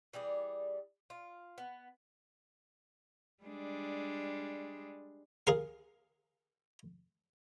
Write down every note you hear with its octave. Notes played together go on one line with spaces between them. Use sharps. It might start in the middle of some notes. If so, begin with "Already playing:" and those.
E3 G3 G#4 D5
F4
B3
G3 G#3 D4
G#4 A#4 F5